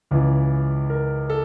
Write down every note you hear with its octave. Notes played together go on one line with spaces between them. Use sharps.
C#2 C#3 E3
A#4
A4